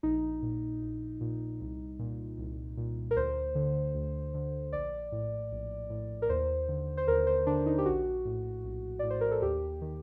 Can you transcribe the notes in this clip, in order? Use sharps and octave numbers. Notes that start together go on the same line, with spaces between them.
A#1 D#4
A#2
A#1
A#2
C2
A#2
C2
A#2
A#4
D2 C5
D3
D2
D3
A#1 D5
A2
A#1
A2
A#4
D#2 C5
D3
C5
D#2 A#4
C5
D3 D4
D#4
G4
A#1 F#4
A2
A#1
A2 D5
C5
A#4
A4
D#2 G4
D#3